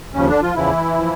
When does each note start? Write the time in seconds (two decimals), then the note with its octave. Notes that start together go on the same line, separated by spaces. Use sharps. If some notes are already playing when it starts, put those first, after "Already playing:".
0.14 D#2 C#3 F3 C#4
0.28 D3 D4
0.42 F3 F4
0.56 E2 C#3 E3 F3 E4
0.98 F3